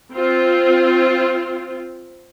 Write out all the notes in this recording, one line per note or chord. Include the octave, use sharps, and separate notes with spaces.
C4 F4